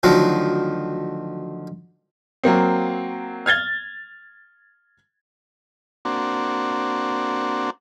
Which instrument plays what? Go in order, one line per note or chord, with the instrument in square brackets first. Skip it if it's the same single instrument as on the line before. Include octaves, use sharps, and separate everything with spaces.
[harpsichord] D2 D#3 F3 F#3
[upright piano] F#3 A#3 C4
F6 G#6 A6 G7
[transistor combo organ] A#3 C4 D4 F#4